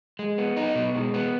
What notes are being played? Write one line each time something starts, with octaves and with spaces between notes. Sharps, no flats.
G#3
B3
D#4
B2
G#3
B3